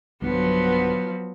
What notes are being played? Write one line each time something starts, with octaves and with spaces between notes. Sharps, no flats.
B1 G2 D3 F3 F#3 B3